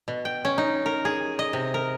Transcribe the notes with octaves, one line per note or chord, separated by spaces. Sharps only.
B2
G5
C#4
D#4
A#4
G#4
D#5
C3
A#4